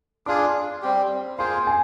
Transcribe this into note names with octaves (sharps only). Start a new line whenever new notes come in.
D4 F4 G#4 D6
G3 C4 G4
A#3 F4 G#4 C5 C6
G#5